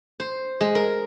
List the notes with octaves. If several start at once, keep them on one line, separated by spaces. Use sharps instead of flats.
C5
G#3
A#4